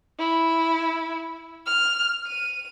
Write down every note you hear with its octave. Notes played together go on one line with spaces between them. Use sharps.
E4
F6
D#7